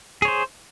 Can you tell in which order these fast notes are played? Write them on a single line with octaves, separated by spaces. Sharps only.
G#4 C#5 C5